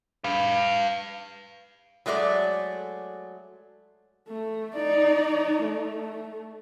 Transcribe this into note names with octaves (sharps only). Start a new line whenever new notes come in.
B4 F5
F#3 G#3 A3 C#5 D5
A3
D#4 D5
A3